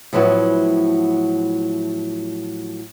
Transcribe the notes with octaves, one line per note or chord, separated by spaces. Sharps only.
A2 F3 F#3 B3 E4